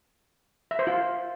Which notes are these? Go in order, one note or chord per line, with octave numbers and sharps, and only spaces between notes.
E5
C5
F4